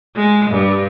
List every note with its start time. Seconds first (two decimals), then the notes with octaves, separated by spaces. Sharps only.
0.16 G#3
0.50 G2